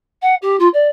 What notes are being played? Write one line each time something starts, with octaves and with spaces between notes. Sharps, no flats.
F#5
G4
F4
D5